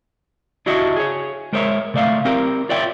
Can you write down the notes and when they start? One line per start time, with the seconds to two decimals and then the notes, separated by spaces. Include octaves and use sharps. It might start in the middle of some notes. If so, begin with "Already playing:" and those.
0.66 D4 E4 F#4 G4 D#5 E5
0.97 G#4 C#5
1.53 G#3 A#4 C5 C#5 E5
1.94 C3 A3 D5 E5 F5
2.25 C4 G4 A#4
2.69 F4 C#5 D5 E5 G5